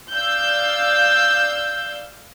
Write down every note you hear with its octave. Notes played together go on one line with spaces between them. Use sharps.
D5 F5 E6 G6